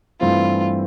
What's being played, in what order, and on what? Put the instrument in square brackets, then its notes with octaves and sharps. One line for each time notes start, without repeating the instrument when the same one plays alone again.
[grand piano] G2 E3 A3 C4 E4 [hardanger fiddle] F4